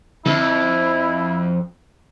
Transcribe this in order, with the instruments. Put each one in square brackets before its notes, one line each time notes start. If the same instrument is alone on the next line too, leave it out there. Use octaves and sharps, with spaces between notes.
[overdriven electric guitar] F2 [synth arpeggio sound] D3 [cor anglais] E4